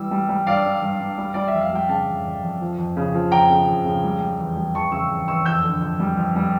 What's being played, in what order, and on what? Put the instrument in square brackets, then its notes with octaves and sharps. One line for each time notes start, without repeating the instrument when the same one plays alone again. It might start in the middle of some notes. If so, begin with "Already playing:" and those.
Already playing: [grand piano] E3 G3 E6
G3
G3
G2 D5 F5
G2
G2
G2
G3
G3 D5
E5
F2
F5
G3 G5
C#3 F5 A5
F2
F2
F2
F3
F2
C#3
F3
F2 G5 A#5
C#3
F2
C#3
G3
G3
E2
G3
E2 A5 C#6
C#3 C#6 E6
E2
E2 C#6 E6
F2 E6 G6
D3
F2
G3
F2
G3